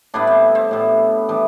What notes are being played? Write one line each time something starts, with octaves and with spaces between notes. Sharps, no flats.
A2 G3 B3 D4
C4
C4
A2 G3 B3
E3 G3 B3 D4